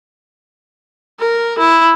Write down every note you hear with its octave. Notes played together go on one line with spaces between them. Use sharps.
A#4
E4